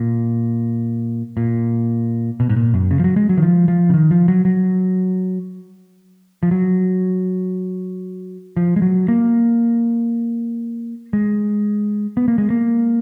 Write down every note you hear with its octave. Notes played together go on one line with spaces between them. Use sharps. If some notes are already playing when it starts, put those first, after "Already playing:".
Already playing: A#2
A#2
B2
G#2
A#2
F#2
C#3
F3
F#3
G#3
F#3
D#3
F3
F3
C#3
D#3
F3
F#3
F#3
F3
F#3
F3
G#3
F#3
A#3
G#3
B3
A#3
G#3
A#3